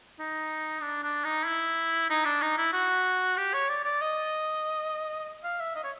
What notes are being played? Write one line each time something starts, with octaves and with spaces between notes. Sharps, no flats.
D#4
D4
D4
D#4
E4
D#4
D4
D#4
E4
F#4
G4
C#5
D5
D5
D#5
F5
E5
D#5
C#5